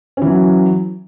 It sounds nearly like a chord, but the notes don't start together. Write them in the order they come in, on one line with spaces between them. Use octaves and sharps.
C#4 E3 F#3